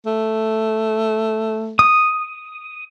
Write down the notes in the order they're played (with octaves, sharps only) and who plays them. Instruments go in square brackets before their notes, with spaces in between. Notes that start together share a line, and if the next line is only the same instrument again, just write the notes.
[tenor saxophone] A3
[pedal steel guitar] D#6